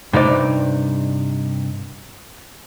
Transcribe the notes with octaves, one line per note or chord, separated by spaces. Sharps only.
G2 C3 D#4 D5